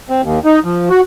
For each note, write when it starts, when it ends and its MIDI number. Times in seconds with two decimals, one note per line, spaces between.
0.10 0.22 60
0.22 0.39 39
0.45 0.59 63
0.64 0.89 53
0.90 1.01 66